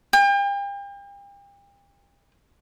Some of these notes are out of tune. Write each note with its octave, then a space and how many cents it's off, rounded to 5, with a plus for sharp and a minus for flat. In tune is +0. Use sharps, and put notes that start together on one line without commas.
G5 +40